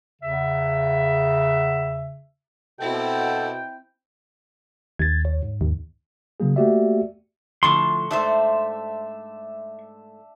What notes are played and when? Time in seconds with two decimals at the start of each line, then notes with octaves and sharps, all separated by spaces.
0.22 E2 C#3 E5
2.80 B2 C4 E4 A4 G5
4.99 D#2 G#6 A6
5.25 C#5
5.43 G#2
5.61 D#2
6.40 C#3 F#3 A#3 G#4
6.56 A3 A#3 F#4 G4 D5 E5
7.63 A2 D3 F3 C6 C#6
8.11 G#2 A3 D4 C5 E5